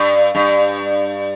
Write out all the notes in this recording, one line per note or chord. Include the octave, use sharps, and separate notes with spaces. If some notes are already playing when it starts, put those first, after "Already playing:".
Already playing: G2
G2